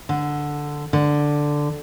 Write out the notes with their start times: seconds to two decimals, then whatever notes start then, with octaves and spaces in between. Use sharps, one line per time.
0.09 D3
0.93 D3